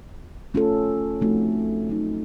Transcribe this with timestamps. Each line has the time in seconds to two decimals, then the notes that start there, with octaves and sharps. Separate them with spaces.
0.54 A3 C#4 F4 A4
1.21 F3 A3 C4 D#4 F#4
1.89 F#3 A3 D#4